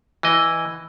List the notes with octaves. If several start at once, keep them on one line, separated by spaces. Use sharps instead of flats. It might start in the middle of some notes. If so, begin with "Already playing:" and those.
E3 D#5